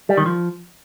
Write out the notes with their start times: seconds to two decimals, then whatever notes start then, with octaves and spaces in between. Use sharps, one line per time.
0.09 G3
0.17 D#3
0.26 F3